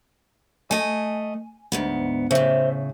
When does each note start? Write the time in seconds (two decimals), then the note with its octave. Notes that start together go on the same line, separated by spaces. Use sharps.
0.71 A3 D#5 G#5
1.72 D2 G#2 B3
2.31 A2 C#3 C5 E5